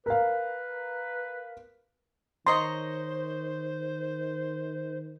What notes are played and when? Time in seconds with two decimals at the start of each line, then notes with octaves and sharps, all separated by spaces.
0.06 A#4 B4 F5
2.47 D#3 C5 C#5 D#5 A#5 C6